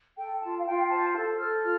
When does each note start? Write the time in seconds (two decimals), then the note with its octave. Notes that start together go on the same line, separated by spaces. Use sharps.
0.16 A4 G5
0.40 F4 A5
0.57 F5
0.65 F4 G5
0.83 G5
0.89 C5 A5
1.13 A4 A5
1.38 A4 F6
1.62 F4 F6